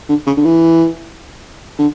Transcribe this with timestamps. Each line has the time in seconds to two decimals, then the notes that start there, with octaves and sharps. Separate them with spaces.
0.09 D3
0.27 C#3
0.37 D3
0.45 E3
1.78 D3